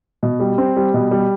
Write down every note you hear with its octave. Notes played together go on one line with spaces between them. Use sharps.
B2
G3
C4
G3
B2
G3